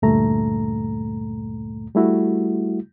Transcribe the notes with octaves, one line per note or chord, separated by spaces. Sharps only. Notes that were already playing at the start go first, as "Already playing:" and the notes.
D2 G2 A#2 A3 A#5
G3 A3 E4 F#4